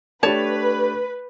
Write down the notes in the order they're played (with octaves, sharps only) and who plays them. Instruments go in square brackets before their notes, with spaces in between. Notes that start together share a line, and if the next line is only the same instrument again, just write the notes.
[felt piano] A3 D4 G4 [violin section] B4 [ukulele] C#5 A5